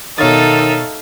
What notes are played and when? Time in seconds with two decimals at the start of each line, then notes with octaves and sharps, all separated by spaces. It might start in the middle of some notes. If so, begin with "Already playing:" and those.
0.18 B2 D#3 D#4 A4 C#5 E5 F5 A6